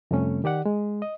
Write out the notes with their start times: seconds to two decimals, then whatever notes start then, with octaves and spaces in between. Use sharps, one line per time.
0.11 F2 C3 G3 A3 C#4
0.44 D#3 G4 D5 F#5
0.66 G#3
1.02 D#5